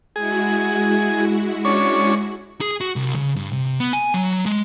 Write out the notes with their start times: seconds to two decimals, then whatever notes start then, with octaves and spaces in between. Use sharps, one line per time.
0.16 G#3 E4 F#4 G#4
1.65 C#4 D4 C#5
2.61 G#4
2.81 F#4
2.96 C2
3.16 C#3
3.36 G2
3.52 C3
3.66 C3
3.80 B3
3.93 G#5
4.14 F#3
4.46 G#3